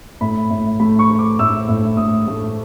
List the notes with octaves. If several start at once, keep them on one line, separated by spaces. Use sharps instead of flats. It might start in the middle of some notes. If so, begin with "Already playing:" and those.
A2 B5
A2
A3 B5
C#6
A3
D6
A2 E6
A2
A2 D#6
A3